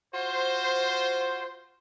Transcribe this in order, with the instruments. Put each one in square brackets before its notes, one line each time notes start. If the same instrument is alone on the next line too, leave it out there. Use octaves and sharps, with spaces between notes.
[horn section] F4 F#4 C5